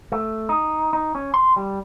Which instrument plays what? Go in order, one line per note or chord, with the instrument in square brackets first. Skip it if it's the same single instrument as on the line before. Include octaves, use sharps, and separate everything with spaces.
[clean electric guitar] A3
D#4
D#4
C#4
C6
G3